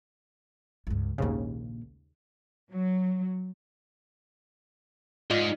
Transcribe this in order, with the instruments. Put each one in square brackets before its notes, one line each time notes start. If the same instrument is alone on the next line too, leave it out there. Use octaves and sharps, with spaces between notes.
[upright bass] C#2 G2
[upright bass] A#1 A#3 [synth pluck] D#2 G#2 C#3
[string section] F#3
[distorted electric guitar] G#2 [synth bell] F4 D5 D#5